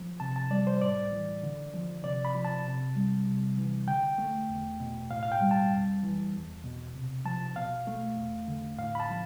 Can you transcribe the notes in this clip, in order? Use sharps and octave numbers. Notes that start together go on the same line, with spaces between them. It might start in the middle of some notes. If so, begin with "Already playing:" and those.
Already playing: F3
C3 A5
A5
G3 D5
C5
A2 D5
E3
D3
F3
C3 D5
B5
F3
A5
C3
G3
C3
E3
D3 G5
A3
E2
B2
A2 F5
F5
G5
G3
A5
F2
E3
E2
B2
C3
F3 A5
B2 F5
A3
E2
D3
A2 F5
B5
A5
F3